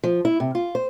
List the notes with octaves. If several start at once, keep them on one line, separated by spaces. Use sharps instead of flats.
F3
E4
C3
F4
C5